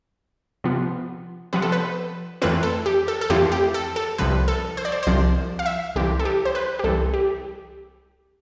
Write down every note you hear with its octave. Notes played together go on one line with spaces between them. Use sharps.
C3 F3 B3 F4
C3 F3 B3 F4 B4
A4
B4
F2 E3 A3 C4 F4 B4
A4
G4
A4
A4
F2 E3 A3 C4 F4 G4
G4
A4
A4
C2 C3 F3 B4
A4
C5
D5
C5
C5
C2 C3 F3 D5
F5
E5
C2 C3 E3 G4
A4
G4
C5
B4
G4
C2 C3 E3 A4
G4